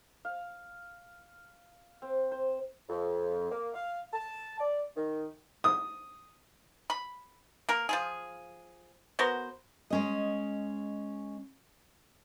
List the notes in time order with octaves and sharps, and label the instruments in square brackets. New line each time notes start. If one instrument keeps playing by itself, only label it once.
[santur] F5
C4
C5
[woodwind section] F2
A#3
F5
A5
D5
D#3
[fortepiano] D#6
[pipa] B5
A#3 A#4
F3 F4 G#4
B3 F#4 A#4 C5
[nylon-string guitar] G#3 C#4 D#5